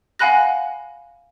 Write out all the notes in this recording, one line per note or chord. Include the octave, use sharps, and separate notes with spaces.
F5 F#5 G#5 B5 F#6 A#6